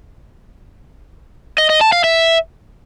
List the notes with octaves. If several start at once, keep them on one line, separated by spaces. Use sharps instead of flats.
D#5
D#5
A5
F5
E5